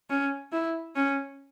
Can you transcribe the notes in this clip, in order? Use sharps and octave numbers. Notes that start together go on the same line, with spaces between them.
C#4
E4
C#4